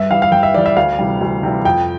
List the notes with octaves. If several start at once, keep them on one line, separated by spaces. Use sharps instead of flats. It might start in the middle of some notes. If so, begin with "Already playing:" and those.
Already playing: G2 E5
E3 G3 F5
F5
G2 G5
E5
E3 G3 D5
E5
D2 F5
C3 E3 G3
D2
C3 E3 G3
F2 G5